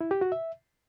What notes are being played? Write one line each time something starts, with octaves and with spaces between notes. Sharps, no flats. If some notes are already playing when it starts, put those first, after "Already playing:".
E4
G4
F#4
E5